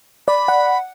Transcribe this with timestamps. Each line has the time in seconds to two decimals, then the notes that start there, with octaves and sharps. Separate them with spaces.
0.28 D5 B5
0.48 F#5